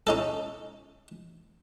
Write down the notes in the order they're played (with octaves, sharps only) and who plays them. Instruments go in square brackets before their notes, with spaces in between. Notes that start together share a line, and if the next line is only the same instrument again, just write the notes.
[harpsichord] C#4 D#4 A4